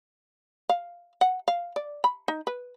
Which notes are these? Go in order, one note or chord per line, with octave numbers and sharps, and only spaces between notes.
F5
F#5
F5
D5
B5
D#4
B4